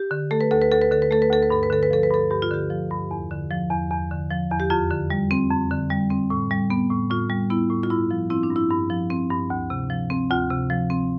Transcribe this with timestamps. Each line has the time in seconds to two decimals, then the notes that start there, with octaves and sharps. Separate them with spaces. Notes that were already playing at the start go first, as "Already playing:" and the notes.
Already playing: G4
0.11 D3
0.31 A3 A4
0.41 B4
0.51 D2 A4
0.62 B4
0.71 D2 A4
0.81 B4
0.91 D3 A4
1.02 B4
1.10 A3 A4
1.22 B4
1.31 D2 A4
1.43 B4
1.50 G2 A4
1.63 B4
1.70 D3 A4
1.83 B4
1.91 F3 A4
2.03 B4
2.11 G2 A4
2.31 G2 G4
2.42 F4
2.51 D3 G4
2.70 F3
2.90 G2
3.11 E2
3.31 D3
3.51 F3
3.71 E2
3.91 E2
4.11 D3
4.30 F3
4.51 E2
4.60 G4
4.70 F2 F4
4.90 D3
5.10 G3
5.31 C4
5.50 F2
5.71 D3
5.90 G3
6.10 C4
6.30 A2
6.51 G3
6.70 B3
6.90 A2
7.10 A2 F4
7.30 G3
7.50 B3 E4
7.70 A2
7.83 F4
7.90 G2 E4
8.11 F3
8.30 C4 E4
8.43 D4
8.50 G2
8.56 E4
8.71 G2
8.90 F3
9.10 C4
9.31 G2
9.50 D2
9.70 C3
9.90 F3
10.10 C4
10.30 D2 F4
10.50 C3
10.70 F3
10.90 C4